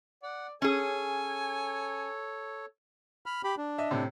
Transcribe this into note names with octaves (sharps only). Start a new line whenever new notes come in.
D5 F#5
C#4 G#4 A4 C#5 G#5
B5 F6
G4 B5
D4
D#5 E5
A2 C3